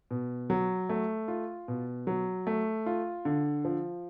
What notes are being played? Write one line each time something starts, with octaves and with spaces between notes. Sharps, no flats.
B2
F#3
A3
F4
B2
F#3
A3
F4
D3
F3